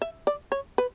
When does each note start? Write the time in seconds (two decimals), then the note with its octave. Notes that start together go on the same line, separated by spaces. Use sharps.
0.02 E5
0.27 D5
0.52 C#5
0.78 B4